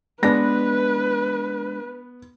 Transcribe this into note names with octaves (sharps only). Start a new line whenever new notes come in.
G#3 B3 D4 B4 A#6